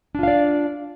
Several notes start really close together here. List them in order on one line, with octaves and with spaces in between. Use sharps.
D4 F4 F5 D5